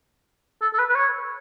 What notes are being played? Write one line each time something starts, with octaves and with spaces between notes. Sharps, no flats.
A4
A4
B4
B4
C#5